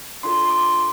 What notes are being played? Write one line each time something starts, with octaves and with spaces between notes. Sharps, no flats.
D4 F4 A4 C6
C6
D6